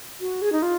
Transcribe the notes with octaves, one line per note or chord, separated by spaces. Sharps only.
F#4
G#4
D#4
F4